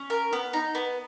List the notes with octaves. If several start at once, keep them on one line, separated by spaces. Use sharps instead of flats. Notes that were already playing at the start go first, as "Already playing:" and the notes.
Already playing: C#4
A#4
B3
D#4
B3